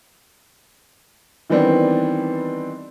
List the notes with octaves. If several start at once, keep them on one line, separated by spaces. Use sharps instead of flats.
D#3 E3 G3 B3 C4 D4